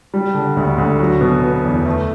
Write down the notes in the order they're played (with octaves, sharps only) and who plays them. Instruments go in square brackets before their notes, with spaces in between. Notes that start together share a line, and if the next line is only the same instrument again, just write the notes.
[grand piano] G3
D3
D2
D2
F#3
B2
B3
E2
A3